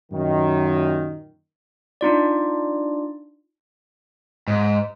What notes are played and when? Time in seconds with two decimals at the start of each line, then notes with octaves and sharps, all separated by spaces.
0.12 F#2 A#2 D#3
2.01 D4 D#4 F4 D5
4.48 G#2